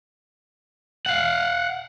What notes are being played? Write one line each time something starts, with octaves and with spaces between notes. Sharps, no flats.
F5 F#5